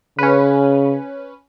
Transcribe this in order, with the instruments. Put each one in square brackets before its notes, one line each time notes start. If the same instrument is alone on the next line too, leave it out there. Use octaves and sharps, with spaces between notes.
[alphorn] C#3 [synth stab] C#4 B4